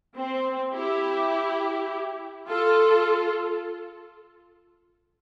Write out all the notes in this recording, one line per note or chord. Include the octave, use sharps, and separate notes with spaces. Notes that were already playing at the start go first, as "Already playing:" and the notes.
C4
E4 G4
F4 A4